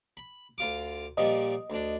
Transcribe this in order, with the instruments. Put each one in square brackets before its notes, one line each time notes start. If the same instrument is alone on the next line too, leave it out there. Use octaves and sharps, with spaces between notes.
[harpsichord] B5
D2 F4 D6
[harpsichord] A#2 F3 G3 [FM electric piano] D#5
[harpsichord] D2 D4